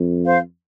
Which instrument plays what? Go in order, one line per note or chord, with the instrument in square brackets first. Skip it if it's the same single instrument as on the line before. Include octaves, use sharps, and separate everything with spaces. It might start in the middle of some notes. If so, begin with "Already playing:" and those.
Already playing: [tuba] F2
[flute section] C5 F5